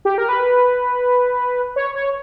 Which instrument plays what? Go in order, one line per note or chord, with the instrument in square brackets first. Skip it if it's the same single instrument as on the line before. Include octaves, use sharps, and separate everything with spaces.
[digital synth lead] G4
A#4
B4
C#5
C#5